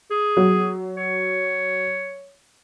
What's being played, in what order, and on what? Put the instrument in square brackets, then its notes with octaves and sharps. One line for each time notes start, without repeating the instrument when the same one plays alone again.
[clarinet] G#4
[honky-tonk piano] F#3
[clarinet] C#5